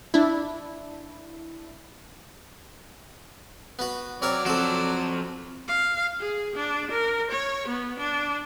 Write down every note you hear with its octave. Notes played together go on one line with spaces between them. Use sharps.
D4 E4
B3 F#4
F#3 C4 A#4 C#5 D5
F3 C4 F#4 A4
F5
G#4
D4
A#4
C#5
B3
D4